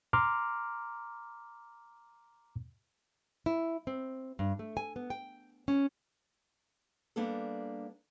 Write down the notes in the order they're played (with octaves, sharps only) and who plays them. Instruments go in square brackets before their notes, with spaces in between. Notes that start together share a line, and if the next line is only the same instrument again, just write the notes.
[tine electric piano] A#5 C6 D6 F6
[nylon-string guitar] E4
C4
G2
A3
G#5
B3
G5
C#4
G3 A#3 B3 D4 A4